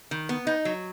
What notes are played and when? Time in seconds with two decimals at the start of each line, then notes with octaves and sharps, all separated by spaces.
0.11 D#3
0.29 B3
0.47 D#4
0.65 F#3